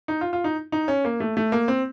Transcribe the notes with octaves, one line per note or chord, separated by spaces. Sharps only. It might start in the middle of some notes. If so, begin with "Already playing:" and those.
D#4
F4
F4
D#4
D#4
C#4
A#3
A3
A3
A#3
C4